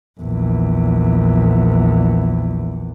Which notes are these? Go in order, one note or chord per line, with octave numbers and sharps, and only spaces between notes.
A#1 E2